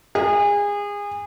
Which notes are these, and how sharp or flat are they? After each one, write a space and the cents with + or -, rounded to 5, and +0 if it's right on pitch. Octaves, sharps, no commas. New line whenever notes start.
G#4 -30